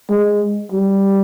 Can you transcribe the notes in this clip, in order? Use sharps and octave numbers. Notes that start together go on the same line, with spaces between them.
G#3
G3